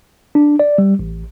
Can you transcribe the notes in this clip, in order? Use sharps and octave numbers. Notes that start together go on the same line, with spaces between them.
D4
D5
G3
A1